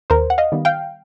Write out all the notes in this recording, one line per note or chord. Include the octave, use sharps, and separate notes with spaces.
D#2 A#4 C5
F#5
D#5 F5
D#3 G3 B3
F5 G5